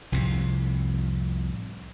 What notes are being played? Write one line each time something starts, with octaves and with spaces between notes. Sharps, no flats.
C2 F2 A2 C3